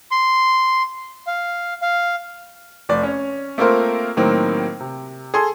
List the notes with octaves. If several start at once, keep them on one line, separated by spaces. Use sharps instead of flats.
C6
F5
F5
F1 D5
C#4 C#5
A3 A#3 C4 F4 A#4 C5
A2 D#3 F#3 A#3 C4
C3
G#4 A4 C6